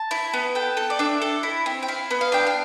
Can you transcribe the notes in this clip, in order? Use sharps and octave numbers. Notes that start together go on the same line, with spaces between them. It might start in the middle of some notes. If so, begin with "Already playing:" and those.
Already playing: A5
E4
B3
A4 G5
A4
D5
D4 E5
A4
E4
C4
G5
E4 F5
B3
F5
D4 G5
F5